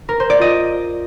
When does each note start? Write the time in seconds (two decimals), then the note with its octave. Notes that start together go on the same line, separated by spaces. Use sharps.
0.09 A#4
0.20 C5
0.30 D5
0.40 F4 D#5